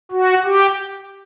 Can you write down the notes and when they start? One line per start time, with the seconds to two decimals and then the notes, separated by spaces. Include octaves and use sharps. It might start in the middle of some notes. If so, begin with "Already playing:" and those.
0.11 F#4
0.44 G4